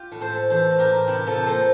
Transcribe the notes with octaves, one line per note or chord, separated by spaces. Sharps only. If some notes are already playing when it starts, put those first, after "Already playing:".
Already playing: F4 G4
A2
A4 C5
A3
E3 A4 C5
A2
G4 A#4
A2
C3 E4 G4
C3 F4 A4
A#3 A4 C5